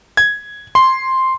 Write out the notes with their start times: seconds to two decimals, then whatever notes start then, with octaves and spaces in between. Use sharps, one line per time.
0.17 G#6
0.75 C6